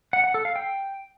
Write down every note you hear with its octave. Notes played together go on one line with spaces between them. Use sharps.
F#5
F#5
A4
F5
G5